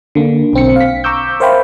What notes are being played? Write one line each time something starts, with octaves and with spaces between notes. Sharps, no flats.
D3 A#3
B1 C4 C#7
F5 B6
A#5 C#6 D6 E6 G6
A#4 C5 E5 F5 G5 B5